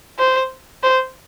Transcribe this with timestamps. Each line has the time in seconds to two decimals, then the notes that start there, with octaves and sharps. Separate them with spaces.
0.19 C5
0.83 C5